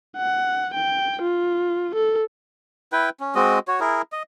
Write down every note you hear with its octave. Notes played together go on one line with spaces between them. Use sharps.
F#5
G5
F4
A4
E4 B4 G5
C#4
G#3 C4 F#4 D#5
F#4 C#5
E4 G#4 A#4
D#5